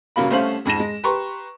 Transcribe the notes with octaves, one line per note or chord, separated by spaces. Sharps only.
G1 C#3 F#3 A#3 B5
C2 A3 C#4 C5 F5 F#7
F2 G#2 A#6 E7
G#3
G4 B4 A#5 C6 C#6